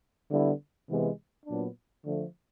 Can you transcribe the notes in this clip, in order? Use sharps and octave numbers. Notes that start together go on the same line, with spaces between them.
D3 G3 B3 E4
C3 E3 G#3 B3
A#2 F#3 B3 D4
D3 F3 A3